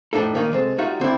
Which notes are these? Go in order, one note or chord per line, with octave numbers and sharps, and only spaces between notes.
F2 A2 D4 D#4 A4
A#2 D#3 A#3 D#4 C#5
C2 G#3 C4 A4
G3 D#4 F4 F#4 E5 F#5
D3 C4 D4 E4